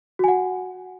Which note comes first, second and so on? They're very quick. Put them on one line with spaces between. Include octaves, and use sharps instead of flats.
F#4 G#5 F#5